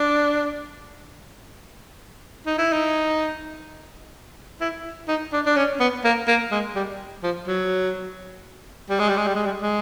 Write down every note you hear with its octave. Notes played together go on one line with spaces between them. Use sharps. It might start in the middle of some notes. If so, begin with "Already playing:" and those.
Already playing: D4
D#4
E4
D#4
E4
D#4
D4
D4
C#4
B3
A#3
A#3
G#3
G3
F3
F#3
G3
G#3
G3
G#3
G3
G#3
G3
G#3